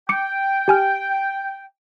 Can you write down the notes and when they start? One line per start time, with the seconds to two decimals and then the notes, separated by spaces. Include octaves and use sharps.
0.09 G5 D6 C#7
0.68 G4 G#5 F6